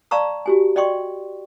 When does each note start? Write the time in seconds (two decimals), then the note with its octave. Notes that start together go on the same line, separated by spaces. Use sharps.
0.11 D5 F5 A5 A#5 C#6 E6
0.46 F#4 G4 G#5
0.76 D5 D#5 G5 C6 C#6